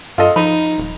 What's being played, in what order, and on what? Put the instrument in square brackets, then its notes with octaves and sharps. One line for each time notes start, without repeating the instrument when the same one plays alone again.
[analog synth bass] G2 [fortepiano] F4 A4 D#5
[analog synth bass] F3 [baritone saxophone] D#4 [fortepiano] B5
[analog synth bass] D#1